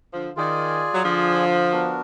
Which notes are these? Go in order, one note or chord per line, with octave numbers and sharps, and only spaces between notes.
D3 F3
D#3 F4 G#4 D5 G#5
F#3
D3 F3
B3 D4 F#4 A#4